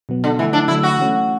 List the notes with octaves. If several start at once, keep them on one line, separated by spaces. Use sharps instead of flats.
B2 F#3 B3
D3
D3 E3 A3 E4
D4
D3 F#3 A3 D4 E4 F#4
F#4
E3 A3 C#4